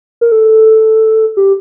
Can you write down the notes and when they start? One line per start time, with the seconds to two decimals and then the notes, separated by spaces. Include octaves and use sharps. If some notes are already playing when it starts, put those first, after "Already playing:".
0.21 A#4
0.32 A4
1.37 G4